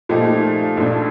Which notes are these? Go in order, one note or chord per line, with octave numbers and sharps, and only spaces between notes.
A#2 F3 A3 D#4 G4
A#1 A#2 A3 D4